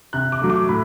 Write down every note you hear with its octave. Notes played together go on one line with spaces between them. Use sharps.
C3 F#6
D6
F#3 A3
D6
A2 B5